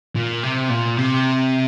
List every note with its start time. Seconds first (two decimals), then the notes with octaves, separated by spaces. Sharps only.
0.15 A#2
0.44 C3
0.70 A#2
0.98 C3